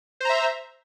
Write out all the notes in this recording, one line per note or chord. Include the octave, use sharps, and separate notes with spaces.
C5 E5 A#5